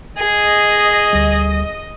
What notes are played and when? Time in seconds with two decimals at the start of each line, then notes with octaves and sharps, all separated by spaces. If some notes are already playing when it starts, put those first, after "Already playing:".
0.18 G#4 D#5
1.13 D2 G3